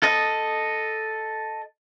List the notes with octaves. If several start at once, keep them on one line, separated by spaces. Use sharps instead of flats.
A4 D#5